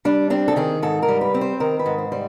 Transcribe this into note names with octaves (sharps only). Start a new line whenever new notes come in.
G3 D4
C4 D4
A4
D#3 G#4
G#2 A4
A#4
G3
B4
C4
C5
D#3 A#4
B4
G#2
C5
G3 C5